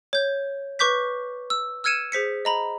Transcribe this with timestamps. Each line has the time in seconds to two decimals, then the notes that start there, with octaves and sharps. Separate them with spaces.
0.13 C#5 G6
0.79 B4 C#6 D6 G6 B6
1.50 E6
1.84 E6 F6 G#6 C#7 D#7 E7
2.12 G#4 C5 B6 C#7
2.45 D#5 A#5 B5